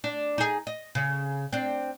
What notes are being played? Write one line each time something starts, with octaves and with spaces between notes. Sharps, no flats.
D4
D#4 G#4
D#5
C#3
C4 D4